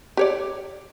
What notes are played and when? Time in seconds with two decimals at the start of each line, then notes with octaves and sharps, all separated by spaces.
0.17 G4 C#5 D5